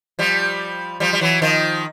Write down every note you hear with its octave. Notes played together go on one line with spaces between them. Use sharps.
F3 G3
F3 G3
G3
E3 F#3
D#3 F3